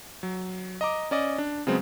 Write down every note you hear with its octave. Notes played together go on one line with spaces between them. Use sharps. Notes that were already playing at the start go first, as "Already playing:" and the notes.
F#3
D#5 A#5 D6
C#4 D5 D#5
D4
C#3 F#3 G#3 B3 C4